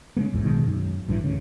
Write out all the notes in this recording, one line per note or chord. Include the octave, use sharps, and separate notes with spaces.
C#3 G#3 A#3
A#1 E2 G#2
B1 B2 D#3 G#3
F#2
A1 G2 D#3 E3
D2 C#3